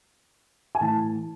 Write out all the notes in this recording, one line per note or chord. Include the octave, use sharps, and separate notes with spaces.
G#5
A2 E3 A5